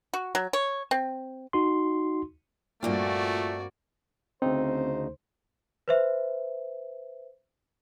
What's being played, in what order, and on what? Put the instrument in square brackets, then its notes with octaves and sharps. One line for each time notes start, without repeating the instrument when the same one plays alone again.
[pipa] F#4
F#3
C#5
C4
[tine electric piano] D#4 F#4 C6
[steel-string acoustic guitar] G2 A#3 C4 [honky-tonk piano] A#2 [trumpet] A3 [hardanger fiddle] F#4 D5
[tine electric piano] D2 C#3 D#4 [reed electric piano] C4 [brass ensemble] C5
[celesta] B4 C5 E5